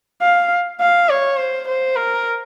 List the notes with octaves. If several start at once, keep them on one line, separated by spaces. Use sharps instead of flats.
F5
F5
C#5
C5
C5
A#4